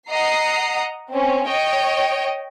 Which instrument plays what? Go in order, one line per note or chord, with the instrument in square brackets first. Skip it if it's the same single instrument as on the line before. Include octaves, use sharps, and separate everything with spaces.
[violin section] D#5 F#5 A#5 D#6 C7
C4 C#4
C#5 D#5 G5